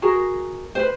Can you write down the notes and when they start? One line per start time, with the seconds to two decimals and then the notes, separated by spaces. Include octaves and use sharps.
0.02 F#4 G#4 A#4
0.75 B4 C5